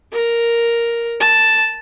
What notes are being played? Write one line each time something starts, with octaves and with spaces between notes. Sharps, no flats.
A#4
A5